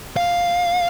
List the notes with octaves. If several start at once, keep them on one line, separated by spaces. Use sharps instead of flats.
F5